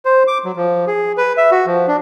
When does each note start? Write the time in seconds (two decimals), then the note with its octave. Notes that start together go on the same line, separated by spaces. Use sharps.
0.05 C5
0.27 D6
0.45 F#3
0.56 F3
0.87 G#4
1.17 B4
1.37 E5
1.51 F#4
1.66 F3
1.88 D4